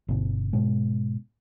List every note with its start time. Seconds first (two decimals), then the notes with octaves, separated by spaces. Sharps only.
0.08 G1 B2 D3
0.53 G#2 B2 G#3